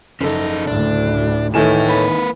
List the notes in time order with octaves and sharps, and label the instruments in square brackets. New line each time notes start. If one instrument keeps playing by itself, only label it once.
[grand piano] F#1 A4 [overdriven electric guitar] C#3 D#4
[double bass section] D2 A2 [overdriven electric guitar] D4
[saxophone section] A2 [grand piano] D#3 G#5 E7 [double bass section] E3
[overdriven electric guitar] A#3 B4